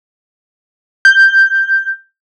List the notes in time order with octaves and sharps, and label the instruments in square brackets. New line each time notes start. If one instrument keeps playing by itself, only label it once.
[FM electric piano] G6